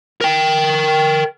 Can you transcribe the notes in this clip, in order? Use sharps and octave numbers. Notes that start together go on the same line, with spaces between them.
A#4 G5